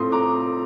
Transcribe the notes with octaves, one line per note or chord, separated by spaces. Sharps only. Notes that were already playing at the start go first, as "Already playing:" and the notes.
Already playing: A2 A3 C4 F4 C6 D#6
A#5 D6